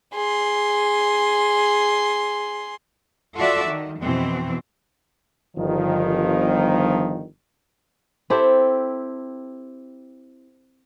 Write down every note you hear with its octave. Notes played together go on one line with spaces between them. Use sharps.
G#4 C6
F4 F#4 A4 D5 E5
D#3
F2 B2 E3 C4
G1 D#3 F3
C4 E4 G4 A4